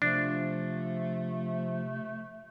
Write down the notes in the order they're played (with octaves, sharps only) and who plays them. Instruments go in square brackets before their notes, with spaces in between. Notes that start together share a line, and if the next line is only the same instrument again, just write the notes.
[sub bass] C3 [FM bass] F3 [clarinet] A3 [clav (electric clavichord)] D4